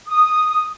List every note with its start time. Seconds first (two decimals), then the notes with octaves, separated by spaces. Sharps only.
0.07 D#6